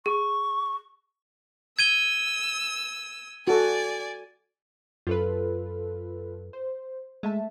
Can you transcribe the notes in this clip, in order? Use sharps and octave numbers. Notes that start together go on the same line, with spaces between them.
G#4 C#6
E6 G#6 D#7 G7
F#4 A4 D5 G#5
F#2 F4 A4 B4
C5
G#3 A3 E5 A5